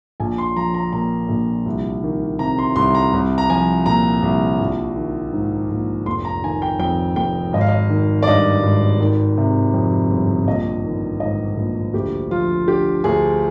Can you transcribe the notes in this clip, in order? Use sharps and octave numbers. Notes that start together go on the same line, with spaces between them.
A#1 G#5
C6
F3 A#5
A#5
A#2 A#5
A#1
C2
D#3
C3 A#5
C6
C2 C6
A#5
C2
A#5
F3 G#5
A#2 A#5
C2
A#1
D#3
G#2
A#1
F1 C6
A#5
D#3 G#5
G5
F2 G5
F1 G5
G#1 D#5
F5
D#5
D#3
D5
G2 D#5
G#1
D#3
C3
F2
G1
A#1 D#5
D#3
G#2 D#5
A#1
D2 G4
F3 F4
D3 G4
D2 G#4